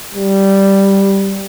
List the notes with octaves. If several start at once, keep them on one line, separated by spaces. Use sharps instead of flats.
G3